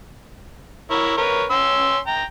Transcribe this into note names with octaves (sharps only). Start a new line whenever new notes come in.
E4 A#4 C#5
A#4 B4 C#5
C#4 C6 E6
G5 A#5